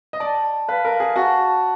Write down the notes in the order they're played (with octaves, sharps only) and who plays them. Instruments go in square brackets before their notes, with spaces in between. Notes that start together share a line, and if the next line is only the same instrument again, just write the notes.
[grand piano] D#5
[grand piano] D5 [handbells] A5
[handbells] A5
[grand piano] B4 [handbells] F5
[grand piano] A#4
[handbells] F5
[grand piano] G#4
[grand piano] F#4 [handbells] A5
[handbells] A5